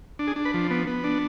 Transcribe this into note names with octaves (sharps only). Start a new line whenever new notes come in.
D4
G#4
D4
B4
F3
B3
B3
D4